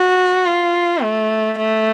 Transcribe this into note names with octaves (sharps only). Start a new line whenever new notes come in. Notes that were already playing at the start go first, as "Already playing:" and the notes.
Already playing: F#4
F4
A3
A3